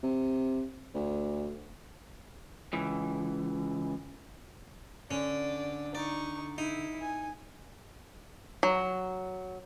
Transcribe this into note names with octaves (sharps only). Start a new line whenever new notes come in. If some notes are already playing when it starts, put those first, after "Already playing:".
C3
D2
C#2 E3
D3 C#4 D5
D#4 D5 C#6
D#4 E4
G#5
F#3